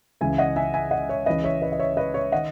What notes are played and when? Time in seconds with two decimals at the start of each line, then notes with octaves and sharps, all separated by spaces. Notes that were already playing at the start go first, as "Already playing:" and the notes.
0.21 C#2 C#3 E3 E5 G#5
0.38 D#5 F#5
0.56 E5 G#5
0.74 E5 G#5
0.91 D#5 F#5
1.09 C#5 E5
1.26 C#2 C#3 E3 B4 D#5
1.44 C#5 E5
1.62 B4 D#5
1.72 D#5
1.79 C#5 E5
1.97 B4 D#5
2.14 C#5 E5
2.32 D#3 D#5 F#5